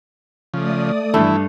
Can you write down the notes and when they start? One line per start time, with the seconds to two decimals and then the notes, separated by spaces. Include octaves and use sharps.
0.54 C#3 F3 A3 D5 D#6
1.14 G2 E3 A3 D4 E4 B5